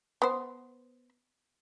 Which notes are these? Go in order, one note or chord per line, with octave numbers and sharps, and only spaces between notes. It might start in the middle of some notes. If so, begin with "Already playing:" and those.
B3 C5